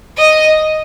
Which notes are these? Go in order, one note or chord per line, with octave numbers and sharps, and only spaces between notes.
D#5